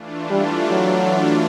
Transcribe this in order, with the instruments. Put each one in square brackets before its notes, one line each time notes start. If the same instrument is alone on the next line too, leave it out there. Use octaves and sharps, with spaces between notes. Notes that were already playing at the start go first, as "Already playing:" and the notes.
Already playing: [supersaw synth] E3 A3 D4 F4
[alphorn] G3
F#3